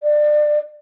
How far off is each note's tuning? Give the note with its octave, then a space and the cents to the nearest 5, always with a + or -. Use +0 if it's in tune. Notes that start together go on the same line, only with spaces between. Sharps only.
D5 +25